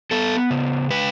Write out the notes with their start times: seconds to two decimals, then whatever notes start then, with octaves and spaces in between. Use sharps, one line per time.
0.11 B3 A4
0.50 C#3
0.91 G#3 B4